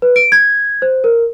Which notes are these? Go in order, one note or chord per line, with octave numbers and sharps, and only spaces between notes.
B4
D7
G#6
C5
A#4